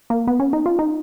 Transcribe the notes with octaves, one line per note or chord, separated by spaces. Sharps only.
A#3
B3
C#4
D#4
F4
D#4